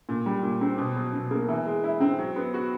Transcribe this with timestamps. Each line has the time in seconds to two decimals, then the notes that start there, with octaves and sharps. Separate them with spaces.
0.09 A#2
0.26 G3
0.43 A#2
0.61 C4
0.78 B2
0.96 F#3
1.13 B2
1.31 A#3
1.49 E3
1.66 G#3
1.84 E4
2.00 C4
2.19 F#3
2.36 B3
2.54 F#4